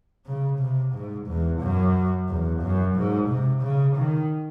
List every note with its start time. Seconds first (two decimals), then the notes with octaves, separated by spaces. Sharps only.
0.26 C#3
0.59 C3
0.94 G#2
1.27 E2
1.61 F#2
2.29 E2
2.62 F#2
2.96 G#2
3.29 C3
3.63 C#3
3.97 D#3